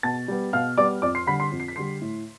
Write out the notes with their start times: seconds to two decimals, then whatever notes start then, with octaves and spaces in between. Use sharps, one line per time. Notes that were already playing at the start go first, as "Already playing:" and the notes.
0.03 B2 A5 A6
0.28 G3 B3
0.53 B2 F5 F6
0.77 G3 B3 D5 D6
1.02 F2 D5 D6
1.15 C6 C7
1.27 D3 G3 B5 B6
1.40 C6 C7
1.52 F2
1.60 C7
1.68 B6
1.76 D3 G3 C6 C7
2.01 A2